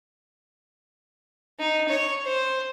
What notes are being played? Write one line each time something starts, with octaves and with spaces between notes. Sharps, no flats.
D#4
C#5
C5